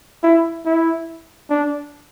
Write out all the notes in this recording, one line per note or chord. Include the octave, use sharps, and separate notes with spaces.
E4
E4
D4